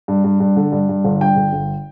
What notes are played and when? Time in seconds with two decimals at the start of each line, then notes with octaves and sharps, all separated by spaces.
0.08 G2
0.24 G2
0.40 G2
0.57 D3
0.72 G2
0.89 G2
1.04 G1
1.21 G2 G5
1.36 G1
1.53 G1